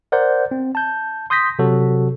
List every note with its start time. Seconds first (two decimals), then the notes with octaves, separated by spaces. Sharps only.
0.12 A#4 C5 D5 F#5 G6
0.51 C4
0.75 A5 G6
1.30 C6 D#6 G6 A#6 B6
1.59 C3 F#3 F#4 A4